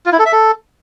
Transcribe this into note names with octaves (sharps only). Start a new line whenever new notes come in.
F4
E4
A4
E5
A4